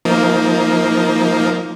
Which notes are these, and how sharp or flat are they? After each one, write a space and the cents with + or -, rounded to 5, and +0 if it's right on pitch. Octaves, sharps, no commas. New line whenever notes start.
F3 +0 A#3 +0 D#4 +25